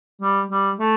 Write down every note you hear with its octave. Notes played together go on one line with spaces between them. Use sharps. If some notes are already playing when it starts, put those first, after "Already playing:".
G3
G3
A3